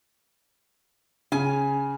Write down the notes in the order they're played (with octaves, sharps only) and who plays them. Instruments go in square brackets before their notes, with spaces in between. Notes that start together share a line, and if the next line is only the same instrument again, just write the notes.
[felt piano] C#3 [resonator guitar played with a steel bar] G#5